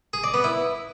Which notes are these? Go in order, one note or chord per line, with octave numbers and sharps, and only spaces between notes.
G#4
D5
B3
E4